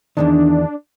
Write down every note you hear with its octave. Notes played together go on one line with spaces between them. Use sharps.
E2 G#2 D#3 D4